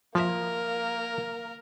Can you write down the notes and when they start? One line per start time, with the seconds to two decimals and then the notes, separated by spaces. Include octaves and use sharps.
0.15 F3 A#3 A#4 E5